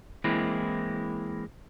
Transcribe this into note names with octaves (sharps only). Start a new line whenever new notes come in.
E3 G#3 A#3 C4 E4